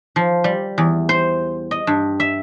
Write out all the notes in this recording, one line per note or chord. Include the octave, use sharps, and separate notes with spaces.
F3
G3
E2
C5
D#5
G2
E5